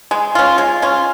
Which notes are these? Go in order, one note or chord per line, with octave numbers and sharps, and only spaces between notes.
G#3
C#4 F4
G#3
C#4 F4